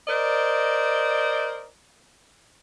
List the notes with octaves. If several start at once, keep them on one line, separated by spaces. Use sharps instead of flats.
A#4 C5 D5 D#5